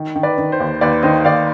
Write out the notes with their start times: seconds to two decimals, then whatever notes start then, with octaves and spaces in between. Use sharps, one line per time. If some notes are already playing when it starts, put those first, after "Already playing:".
Already playing: D#3
0.15 D#3
0.23 B4 D5
0.38 D#3
0.52 C5
0.60 D#2
0.81 D#2 B4 D5
1.03 D#3 C5 D#5
1.25 D#2 D5 F5